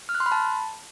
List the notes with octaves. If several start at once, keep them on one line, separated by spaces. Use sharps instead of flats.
F6
F#6
C6
B5
A5